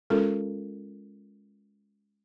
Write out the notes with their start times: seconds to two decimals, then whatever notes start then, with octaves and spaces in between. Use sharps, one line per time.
0.10 G#3 C#4 F4 A4 A#4